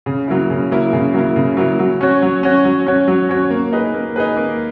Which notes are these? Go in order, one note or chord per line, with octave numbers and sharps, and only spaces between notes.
C#3
F#3 A#3 E4
C#3
F#3 A#3 E4
C#3
F#3 A#3 E4
C#3
F#3 A#3 E4
F#3
C#4 F#4 C#5
F#3
C#4 F#4 C#5
F#3
C#4 F#4 C#5
F#3
C#4 F#4 C#5
A#3
D#4 G#4 B4
A#3
D#4 G#4 B4
A#3